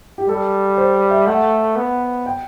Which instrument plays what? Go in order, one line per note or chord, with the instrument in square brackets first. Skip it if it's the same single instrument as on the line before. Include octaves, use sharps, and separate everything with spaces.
[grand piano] G4
[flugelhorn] G3 [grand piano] A4
[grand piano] C5
E5
[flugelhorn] A3 [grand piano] F#5
[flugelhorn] B3
[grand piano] G5